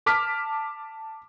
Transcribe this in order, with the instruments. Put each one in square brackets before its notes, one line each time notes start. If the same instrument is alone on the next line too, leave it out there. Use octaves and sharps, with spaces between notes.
[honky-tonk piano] A5 D6 F6 B6